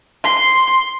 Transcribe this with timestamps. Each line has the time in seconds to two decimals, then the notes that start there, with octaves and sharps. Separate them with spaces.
0.24 C6